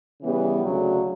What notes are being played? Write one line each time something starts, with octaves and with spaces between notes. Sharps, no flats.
C#3 E3 G3 B3
D2 C#3 F#3